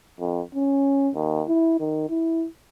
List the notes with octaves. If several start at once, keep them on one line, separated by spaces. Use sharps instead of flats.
F2
C#4
D#2
E4
D#3
E4